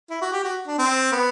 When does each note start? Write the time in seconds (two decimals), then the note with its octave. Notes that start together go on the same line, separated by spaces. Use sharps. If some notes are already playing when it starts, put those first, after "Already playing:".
0.10 E4
0.21 F#4
0.33 G4
0.44 F#4
0.68 D4
0.79 C4
1.12 B3